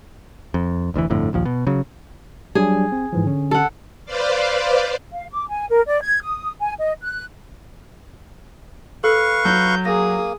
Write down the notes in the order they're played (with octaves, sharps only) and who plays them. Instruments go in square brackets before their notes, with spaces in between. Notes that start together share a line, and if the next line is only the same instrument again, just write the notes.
[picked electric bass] F2
F1 D2 G#2 E3
G1 F2 A2 D3
A#1 D#2 F3
B2
C#3 F#3
[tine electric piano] F#3 G3 D4 [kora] G#4
[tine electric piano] C4
G#2 E3 F3
D3 C#4
[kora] A4 F#5
[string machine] B4 C5 D5 F5
[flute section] F5
D6
G#5
A#4
D5
G#6
D#6
G#5
D#5
F#6
[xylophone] A4 [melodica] B4 F5 C#6
[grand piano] F#3 [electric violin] G6
[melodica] A#3 [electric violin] G#4 D#6 [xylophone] A#6